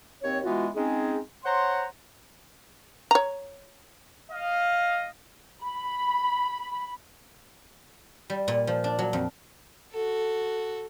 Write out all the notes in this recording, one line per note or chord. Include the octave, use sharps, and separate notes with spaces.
D#2 C4 C#5
E3 G#3 B3 F4 F#4
G#3 C4 C#4 D#4 G#4
C5 C#5 F#5 A#5 C6
C#5 A#5
D#5 F5
B5
G3
A#2
F3
D4
F#3
F2
F#4 A4